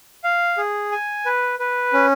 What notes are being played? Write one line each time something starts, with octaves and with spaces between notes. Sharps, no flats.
F5
G#4
G#5
B4
B4
C#4